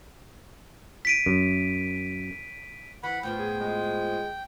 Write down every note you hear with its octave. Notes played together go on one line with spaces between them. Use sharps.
B6 D7 D#7
F#2
E3 F#5 B5
A2 F3 B3 G5
G#4
G#3